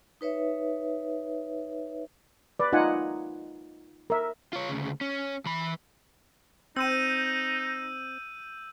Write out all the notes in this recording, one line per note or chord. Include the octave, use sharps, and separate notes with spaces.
D#4 B4 C#5 E5
B4 D5
D#4 F4 F#5 G#5
A#4 E5
F4 C#5
D2 C#3
C#4
E3 B5
C4 D#4 E6 G6 D#7